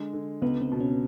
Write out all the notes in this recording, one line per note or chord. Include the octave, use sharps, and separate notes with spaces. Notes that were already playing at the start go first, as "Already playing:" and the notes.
Already playing: D3 G#3
D3
C#2 B3
C4
B2
C#4